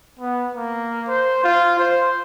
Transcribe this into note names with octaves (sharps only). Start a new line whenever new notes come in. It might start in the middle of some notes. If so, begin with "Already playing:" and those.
B3
A#3
C5
F4
C5